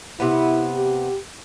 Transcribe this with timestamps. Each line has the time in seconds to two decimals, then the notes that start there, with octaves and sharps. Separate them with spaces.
0.20 C3 B3 E4
0.75 G4